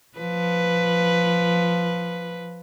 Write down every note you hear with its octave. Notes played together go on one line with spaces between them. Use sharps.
F3 B4